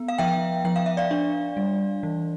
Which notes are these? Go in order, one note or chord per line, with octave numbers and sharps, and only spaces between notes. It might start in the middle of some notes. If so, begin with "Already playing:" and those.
Already playing: B3
F5
F3 E5 G5
F3 G5
F5
E5
D5 F5
D4
G3
E3